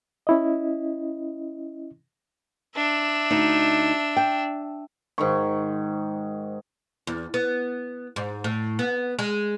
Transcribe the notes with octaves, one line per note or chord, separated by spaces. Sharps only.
C#4 E4 D#5
D4 E5
D2 D#4
G5
G#2 D#3 C#6
E2
B3
G#2
A2
B3
G#3